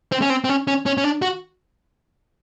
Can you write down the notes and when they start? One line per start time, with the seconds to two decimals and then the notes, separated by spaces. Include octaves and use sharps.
0.12 C4
0.22 C#4
0.30 C4
0.44 C4
0.49 C#4
0.68 C#4
0.86 C#4
0.98 C#4
1.04 D4
1.22 F#4